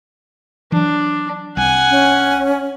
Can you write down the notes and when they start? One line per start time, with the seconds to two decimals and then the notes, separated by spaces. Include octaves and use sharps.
0.72 E3 F#3 D4
1.57 C2 F#5 G#5
1.90 C#4